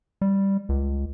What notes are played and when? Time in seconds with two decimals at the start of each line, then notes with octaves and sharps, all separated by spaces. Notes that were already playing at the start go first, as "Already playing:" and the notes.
0.21 G3
0.69 C#2